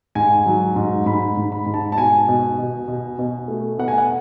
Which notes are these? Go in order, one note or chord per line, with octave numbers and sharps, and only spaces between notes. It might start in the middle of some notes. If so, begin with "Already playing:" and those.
G#2 G#5
F#3
G#2
G#2 B5
G#2
B5
G#2
A5
A5
B2 G#5
B2
B2
B2
B2
A3
B3 F#5
G#5
F#5